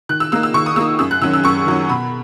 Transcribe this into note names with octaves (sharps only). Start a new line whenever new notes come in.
D#3 F#6
E6
A#3 D#4 E6
E6
D#3 C#6
D#6
A#3 D#4 E6
F#2 E6
F#6
D#3 F#3 C#4 E6
E6
F#2 C#6
D#3 F#3 C#4
B2 B5